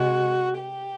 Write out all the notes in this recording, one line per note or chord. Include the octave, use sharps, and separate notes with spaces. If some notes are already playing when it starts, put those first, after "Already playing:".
Already playing: C3 G#3 F#4
G4